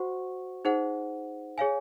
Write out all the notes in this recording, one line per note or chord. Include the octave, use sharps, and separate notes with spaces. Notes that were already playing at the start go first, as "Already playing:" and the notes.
Already playing: F#4 C5 F#5 C#6
D#4 G#4 C5 F#5
G#4 C#5 F5 G#5